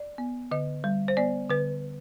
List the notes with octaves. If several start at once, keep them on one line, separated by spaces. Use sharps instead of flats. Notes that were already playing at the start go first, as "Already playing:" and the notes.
Already playing: D5
B3
D3 D#5
G3
C5
B3 D5
D3 B4